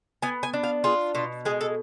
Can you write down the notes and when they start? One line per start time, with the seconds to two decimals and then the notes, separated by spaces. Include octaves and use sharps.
0.22 B3 G#5
0.43 G#5
0.54 D4
0.63 F5
0.84 F4 G#4
1.15 B2 F4
1.45 G#3 G#4
1.61 A4